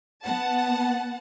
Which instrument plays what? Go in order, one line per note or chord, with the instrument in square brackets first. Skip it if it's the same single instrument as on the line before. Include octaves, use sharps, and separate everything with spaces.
[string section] B3 F#5 A5